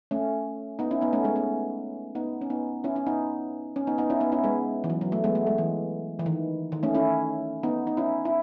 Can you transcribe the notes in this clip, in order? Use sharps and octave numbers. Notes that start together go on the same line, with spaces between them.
A3 C#4
B3 D#4
C#4 E4
B3 D#4
A3 C#4
G#3 B3
A3 C#4
B3 D#4
C#4
B3 D#4
C#4 E4
C#4 E4
B3 D#4
C#4
B3 D#4
B3 D#4
C#4 E4
B3 D#4
C#4 E4
G#3 B3
E3
F#3
F#3
A3
G#3 B3
A3
G#3
E3
E3
D#3
D#3
A3 C#4
C#4 E4
B3 D#4
D#4
C#4 E4
E4